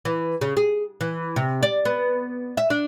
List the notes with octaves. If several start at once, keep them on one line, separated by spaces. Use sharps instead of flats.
E3
C#3
G#4
E3
C3
D5
B3
E5
D4